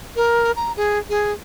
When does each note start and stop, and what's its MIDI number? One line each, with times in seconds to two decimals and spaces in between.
0.16 0.51 70
0.56 0.72 82
0.77 0.99 68
1.09 1.33 68